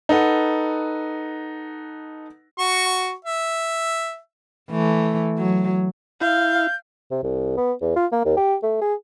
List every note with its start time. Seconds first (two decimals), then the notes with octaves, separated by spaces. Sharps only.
0.09 D#4 A4 B4 F#5
2.59 F#4 C#6
3.25 E5
4.71 E3 A3
5.38 F#3
6.21 E4 F5 G6
7.11 C3
7.23 C2
7.57 B3
7.81 E2
7.96 F4
8.12 A#3
8.25 D#2
8.37 G4
8.63 A3
8.81 G#4